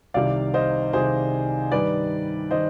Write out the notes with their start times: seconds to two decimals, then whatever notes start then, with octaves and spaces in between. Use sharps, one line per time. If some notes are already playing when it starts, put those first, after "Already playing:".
0.14 C2 C3 D#3 D5 F5
0.54 C5 D#5
0.93 C2 C3 D#3 G#4 C5
1.72 G2 D#3 B4 D5
2.51 D#3 C5 D#5